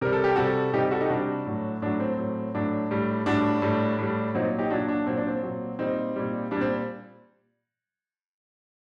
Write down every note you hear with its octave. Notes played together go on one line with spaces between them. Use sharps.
C3 G3 A#4
A4
G4
C3 G3 F#4 A4
C3 G3 D#4 G4
F#4 A4
D#4 G4
C3 G3 D4 F#4
A2 F#3
A2 F#3 D4
C4
A2 F#3
A2 F#3 D4
A2 G3
A2 G3 D4 F#4
A2 G3
A2 G3
A#2 F#3 C4 D#4
D#4 G4
A#2 F#3 D4 F#4
D4
A#2 F#3 C4
D4
C4
A#2 F#3
A#2 G3 C4 D#4
A#2 G3
A#2 G3 D4
C4